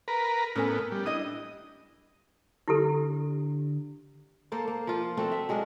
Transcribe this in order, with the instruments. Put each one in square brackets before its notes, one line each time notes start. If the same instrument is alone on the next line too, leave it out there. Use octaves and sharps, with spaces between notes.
[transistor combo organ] A#4 B4
[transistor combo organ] A2 B3 [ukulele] C#4 A#4 G#5
[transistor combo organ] G3
[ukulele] D4 E4 D#5 [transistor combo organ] D#6
[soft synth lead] D3 [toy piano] E4 G4 A4
[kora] A#3 A4 C5
A#3
F3 F4
A3 C4 F#4 D5
E5
F#3 G#3 C#4 D4